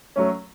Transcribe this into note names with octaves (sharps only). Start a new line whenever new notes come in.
F#3 A3 C#4